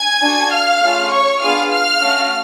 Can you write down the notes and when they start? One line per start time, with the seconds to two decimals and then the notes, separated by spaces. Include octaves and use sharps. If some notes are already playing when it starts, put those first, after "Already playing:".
Already playing: G#5 G#6
0.22 D4 F#4 A4
0.52 F5 F6
0.81 A3 C#4 F4 G#4
1.12 C#5 C#6
1.41 B3 D4 F4 G#4 F5 F6
1.71 F5 F6
2.01 A3 C#4 F#4